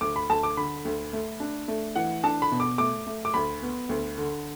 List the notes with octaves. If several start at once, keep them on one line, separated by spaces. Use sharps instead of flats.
D2 D6
B5
D2 A5
D6
D3 B5
D2
A3
D4
A3
E3 F#5
D4 A5
B5
B2
D6
A3 D6
A3
D6
D2 B5
B3
D2
D3